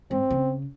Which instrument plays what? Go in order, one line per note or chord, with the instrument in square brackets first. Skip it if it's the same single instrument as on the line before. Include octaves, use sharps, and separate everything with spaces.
[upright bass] G#2 [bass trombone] C4
[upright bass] C#3